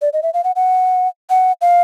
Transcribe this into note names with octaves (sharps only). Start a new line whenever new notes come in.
D5
D#5
E5
F5
F#5
F#5
F#5
F5